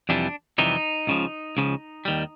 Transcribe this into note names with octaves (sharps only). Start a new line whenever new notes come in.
F2 C3 E3 G3 D4
F2 C3 E3 G3 D#4
C#2 C#3 F3
C#2 C#3 F3
D#2 D#3 G3